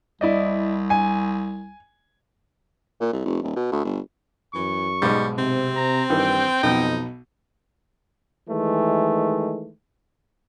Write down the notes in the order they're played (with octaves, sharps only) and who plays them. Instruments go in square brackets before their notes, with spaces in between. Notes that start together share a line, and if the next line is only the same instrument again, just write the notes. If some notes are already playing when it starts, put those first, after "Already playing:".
[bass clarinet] C2 [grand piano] E4 D5 D#5
[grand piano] G#5
[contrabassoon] A#2
C2
F1
D#1
B2
D2
G1
[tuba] F#2 [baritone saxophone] E3 [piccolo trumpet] C#6
[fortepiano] B1 G#2 G#3 [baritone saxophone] G3
[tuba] C3 [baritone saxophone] C4
[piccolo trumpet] A#5
[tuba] G2 [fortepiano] D#3 E3 [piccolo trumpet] G5
[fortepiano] B1 B2 [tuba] F2 [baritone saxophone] D#4
[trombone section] D#3 E3 G#3 A3